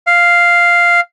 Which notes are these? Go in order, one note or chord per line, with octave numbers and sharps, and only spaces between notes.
F5